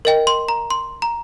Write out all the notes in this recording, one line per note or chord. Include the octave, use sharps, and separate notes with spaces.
A#4 D#5 G5
C6
A#5
C6
A#5